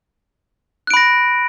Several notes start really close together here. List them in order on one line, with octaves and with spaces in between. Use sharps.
F#6 D7 B5 A#6